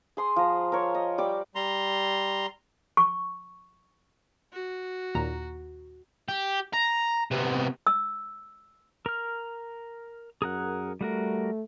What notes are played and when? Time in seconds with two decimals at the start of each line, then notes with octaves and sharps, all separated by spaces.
0.17 G#4 C6 D#6
0.36 F3 A#5
0.72 A#4 C5 C#5
0.94 D#5
1.18 G3 D5 G5 D6
1.55 G3 A#5 C6
2.97 C#6
4.52 F#4
5.15 D#2 A#2 A#5
6.28 G4
6.73 A#5
7.31 C3 B3
7.87 E6
9.06 A#4 F6
10.42 F#2 G#4 A#4 F#5
11.01 G3 A3 F#4 A#4